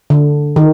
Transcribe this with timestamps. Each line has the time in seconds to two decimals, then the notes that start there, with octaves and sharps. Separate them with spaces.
0.10 D3
0.56 D#3